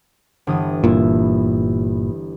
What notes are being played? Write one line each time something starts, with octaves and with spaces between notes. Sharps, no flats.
G1 E3 D#6
G1 A#2 E4